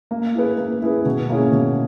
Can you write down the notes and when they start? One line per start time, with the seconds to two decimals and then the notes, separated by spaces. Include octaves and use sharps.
0.11 A#3
0.35 E4 G#4 B4
0.58 A#3
0.82 E4 G#4 B4
1.06 B2
1.29 A#3 C#4 E4 G#4
1.52 B2